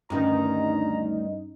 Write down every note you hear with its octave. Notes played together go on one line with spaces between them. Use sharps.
D2 G2 D#3 C#4 D#4 A#5